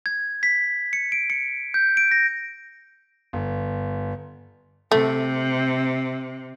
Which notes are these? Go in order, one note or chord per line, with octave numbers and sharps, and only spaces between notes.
G#6
B6
C#7
D7
C#7
G6
D7
A#6
G1
C3 A3